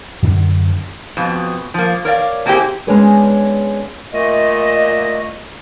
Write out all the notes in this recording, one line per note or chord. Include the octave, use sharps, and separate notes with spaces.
F#2 D3 C4 D4
F2 B2
F3 A#3
A#4 C#5 D5 F5
A3 A#3 C4 E4 G4 G#4
G#3 B3 C#4 D4 G#4 B4
A#2 A3 D#5